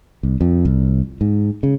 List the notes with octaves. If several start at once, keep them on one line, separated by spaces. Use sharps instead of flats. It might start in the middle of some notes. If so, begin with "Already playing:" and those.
C2
F2
C2
G#2
C#3